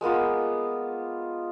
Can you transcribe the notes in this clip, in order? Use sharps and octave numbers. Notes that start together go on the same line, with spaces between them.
G#3 A#3 B3 F4